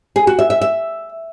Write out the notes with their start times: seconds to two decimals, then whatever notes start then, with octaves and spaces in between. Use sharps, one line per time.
0.16 G#4
0.27 F#4
0.39 E5
0.50 E5
0.61 E5